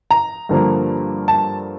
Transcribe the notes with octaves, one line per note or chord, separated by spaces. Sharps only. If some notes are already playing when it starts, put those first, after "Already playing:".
A#5
G2 D3 F3 A#3
A5